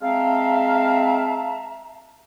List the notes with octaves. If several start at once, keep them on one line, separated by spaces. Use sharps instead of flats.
G#3 C4 E5 F5 A5 A#5